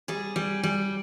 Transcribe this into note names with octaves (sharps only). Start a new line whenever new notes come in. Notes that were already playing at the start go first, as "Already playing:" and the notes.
G3 G#4
G3
G3